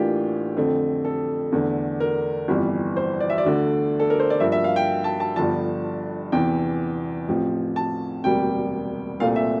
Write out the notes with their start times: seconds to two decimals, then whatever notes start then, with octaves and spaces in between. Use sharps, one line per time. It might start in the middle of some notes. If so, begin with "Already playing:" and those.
Already playing: A1 A2 E3 A#3 D4 F4 G4
0.57 F2 D3 A3 C4
1.05 A4
1.52 E2 D3 A3 D4
2.00 A#4
2.48 G1 F2 E3 G3
2.97 C5
3.20 D5
3.30 E5
3.38 D5
3.45 D2 D3 A3
4.00 A4
4.10 A#4
4.20 C5
4.30 D5
4.40 G2 F3 A#3 E5
4.52 E5
4.64 F5
4.76 G5
5.04 A5
5.20 A5
5.36 G1 G2 D3 F3 A5
6.32 E2 C3 E3 G5
7.28 A1 A2 F3 C4
7.76 A5
8.24 E1 D2 C3 G3 A#3 G5
9.20 C2 A#2 A3 C4 F5
9.36 E5